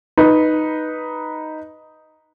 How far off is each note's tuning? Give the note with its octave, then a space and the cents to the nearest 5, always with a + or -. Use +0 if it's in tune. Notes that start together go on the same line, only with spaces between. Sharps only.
D#4 +0 B4 -5